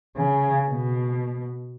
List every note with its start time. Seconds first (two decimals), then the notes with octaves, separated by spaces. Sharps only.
0.16 C#3
0.67 B2